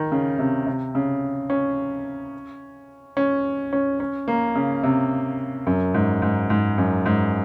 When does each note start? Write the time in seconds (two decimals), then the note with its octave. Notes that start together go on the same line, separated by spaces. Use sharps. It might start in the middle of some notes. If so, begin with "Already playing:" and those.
Already playing: D#3
0.12 C#3
0.39 C3
0.66 C3
0.95 C#3
1.50 C#4
3.17 C#4
3.73 C#4
4.00 C#4
4.28 A#3
4.55 C#3
4.83 C3
5.67 F#2
5.94 G#2
6.22 G#2
6.50 G#2
6.78 F#2
7.06 G#2